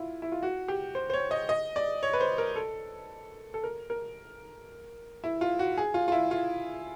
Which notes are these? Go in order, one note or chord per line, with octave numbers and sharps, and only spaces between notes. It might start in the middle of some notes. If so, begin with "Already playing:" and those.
Already playing: E4 F4
E4
F4
F#4
G4
C5
C5
C#5
D#5
D#5
D5
C#5
B4
C5
A#4
A4
A4
A#4
A#4
E4
F4
F#4
G#4
F4
F4
E4
F4